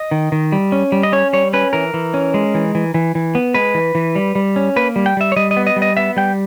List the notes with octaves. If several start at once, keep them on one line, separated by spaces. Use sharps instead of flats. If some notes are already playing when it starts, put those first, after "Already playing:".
Already playing: D#5
D#3
D#3
G3
C#4
G3
D#5
C#4 C#5
G3 C#5
C#4 B4
E3 A#4
E3
C#4
G#3
E3
E3
E3
E3
B3
G#3 B4
E3
E3
G3
G3
C#4
A#3 B4
G3
G5
G3 E5
C#5
G3 D#5
D#5
B3
D#5
G3
D#5
B3 E5
G3 G5